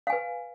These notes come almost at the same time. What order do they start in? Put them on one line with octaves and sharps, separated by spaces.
F5 G#5 B4